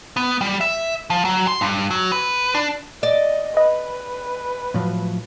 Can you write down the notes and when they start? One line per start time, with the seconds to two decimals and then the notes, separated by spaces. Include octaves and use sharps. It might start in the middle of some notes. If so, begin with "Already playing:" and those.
0.17 B3
0.41 G3
0.61 E5
1.10 F3
1.25 F#3
1.48 C6
1.61 G2
1.91 F#3
2.12 B4
2.54 D4
3.03 D5 D#5
3.57 B4 D#5
4.74 A2 F3 F#3